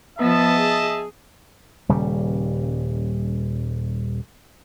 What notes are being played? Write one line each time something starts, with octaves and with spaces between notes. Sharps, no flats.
F3 B3 D#5 E5 A5
G#4
D#1 C#3 G3